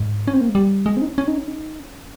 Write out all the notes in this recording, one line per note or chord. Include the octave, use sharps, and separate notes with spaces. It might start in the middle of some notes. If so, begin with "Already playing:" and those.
Already playing: G#2
C#4
C4
A#3
G#3
G3
G#3
C4
D#4
C#4
C#4
D#4
C#4
D#4
C#4